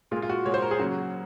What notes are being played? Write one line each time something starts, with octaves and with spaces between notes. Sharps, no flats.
A#2 G#3 F4
F4
F#4
A#2 G#3 C#5
C5
A#4
G#4
C#3 F#3 A#3 F#4